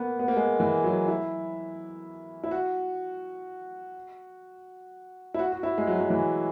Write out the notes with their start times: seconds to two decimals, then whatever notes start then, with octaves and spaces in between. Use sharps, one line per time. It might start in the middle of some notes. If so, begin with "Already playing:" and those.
Already playing: A#3 B3
0.19 B3
0.28 A#3
0.37 G#3
0.60 E3
0.84 F#3
1.08 E4
2.44 E4
2.51 F#4
5.34 E4
5.39 F#4
5.52 F#4
5.63 E4
5.78 G#3
5.87 F#3
6.01 F#3
6.10 E3